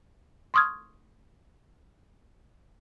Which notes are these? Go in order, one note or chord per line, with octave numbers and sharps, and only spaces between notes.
C6 C#6 D#6 F6 G#6